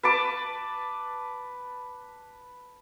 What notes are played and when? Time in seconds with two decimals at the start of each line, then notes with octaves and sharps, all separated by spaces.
0.03 B4 A5 D6